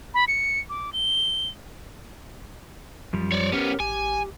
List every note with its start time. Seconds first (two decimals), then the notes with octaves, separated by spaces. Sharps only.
0.14 B5
0.28 C#7
0.69 D6
0.93 G7
3.13 F#2 F3 G3
3.32 C#5 D5
3.52 B3 C#4 G4 A#4
3.80 A1 G4 G#5